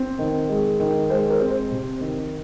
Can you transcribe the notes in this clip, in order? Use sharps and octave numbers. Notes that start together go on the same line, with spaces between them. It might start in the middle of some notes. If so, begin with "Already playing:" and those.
Already playing: C4
D#3
G#3
D#3
G#3 C5
A#4
C4
C5
C3
D#3